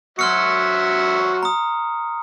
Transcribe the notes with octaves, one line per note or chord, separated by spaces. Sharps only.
F#3 F#4 E5 C6 F6 C#7
A#5 D#6